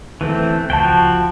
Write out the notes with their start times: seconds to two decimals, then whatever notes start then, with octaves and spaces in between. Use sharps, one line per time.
0.21 E3 A3 C4
0.70 C#2 F3 F#4 G5 A5